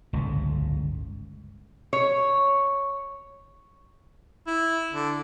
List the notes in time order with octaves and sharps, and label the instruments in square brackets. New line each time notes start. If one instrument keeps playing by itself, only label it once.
[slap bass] G1 C#2 A2
[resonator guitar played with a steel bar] C#5
[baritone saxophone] E4
D3